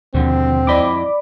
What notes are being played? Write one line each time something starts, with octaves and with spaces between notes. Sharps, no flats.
D#2 B2 D3 F3 C4
F2 E4 D5 D#5 B5 D6